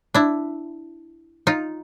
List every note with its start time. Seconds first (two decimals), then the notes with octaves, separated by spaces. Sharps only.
0.14 D4 E4
1.47 D#4 F4